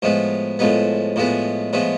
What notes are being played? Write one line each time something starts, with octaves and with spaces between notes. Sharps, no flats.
A2 F3 G#3 B3
A2 F3 G#3 B3
A2 F3 G#3 B3
A2 F3 G#3 B3